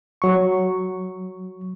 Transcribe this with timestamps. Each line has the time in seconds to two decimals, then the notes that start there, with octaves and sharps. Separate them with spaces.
0.22 F#3 C#6